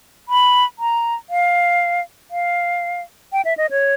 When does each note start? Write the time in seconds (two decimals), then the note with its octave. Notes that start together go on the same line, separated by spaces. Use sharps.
0.29 B5
0.79 A#5
1.30 F5
2.31 F5
3.32 G5
3.45 E5
3.57 D#5
3.71 C#5